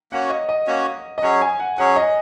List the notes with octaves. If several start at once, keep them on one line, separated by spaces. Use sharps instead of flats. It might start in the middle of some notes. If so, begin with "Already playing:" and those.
A#3 C#4 F#4 C#5 F#5
D#5
D#5
A#3 C#4 F#4 C#5
D#5
F#3 C#4 G#4 C#5 F#5
G#5
F#5
F#3 C#4 G#4 C#5 F#5
D#5